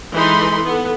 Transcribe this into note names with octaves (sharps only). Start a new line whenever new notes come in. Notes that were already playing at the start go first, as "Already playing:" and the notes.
E3 G#3 D#4 A4 B5 C6
B3 A4